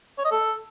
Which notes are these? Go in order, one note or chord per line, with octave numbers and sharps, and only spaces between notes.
C#5
D#5
A4